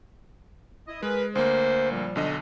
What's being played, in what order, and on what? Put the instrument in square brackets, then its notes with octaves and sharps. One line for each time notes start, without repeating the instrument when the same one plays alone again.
[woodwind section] E4 D#5
[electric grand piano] G#3 [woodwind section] G#4 A#4 B4
[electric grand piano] D2 A#3 [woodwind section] C5
[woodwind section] A#2 F3 G3
[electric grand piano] B1 D3 D#5